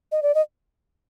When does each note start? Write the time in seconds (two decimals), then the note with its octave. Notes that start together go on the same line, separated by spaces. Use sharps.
0.12 D#5
0.23 D5
0.35 D#5